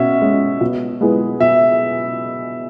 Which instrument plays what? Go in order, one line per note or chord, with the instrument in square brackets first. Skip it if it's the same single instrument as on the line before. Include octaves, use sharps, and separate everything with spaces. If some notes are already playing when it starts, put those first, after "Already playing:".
Already playing: [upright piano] B2 C#4 [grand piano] E5 F#5
[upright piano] G#3 C#4
B2
G#3 B3 E4 G#4
[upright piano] B2 [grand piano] E5